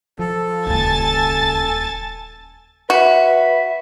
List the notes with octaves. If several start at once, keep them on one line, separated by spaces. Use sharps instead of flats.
F3 A4
D#1 C#2 F4 G#5 A5 A6
F#4 B4 E5